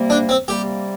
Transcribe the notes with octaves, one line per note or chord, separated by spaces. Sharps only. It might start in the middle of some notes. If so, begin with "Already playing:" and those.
Already playing: C3 G3 A#3
D4
C4
C3 G3 A#3 G4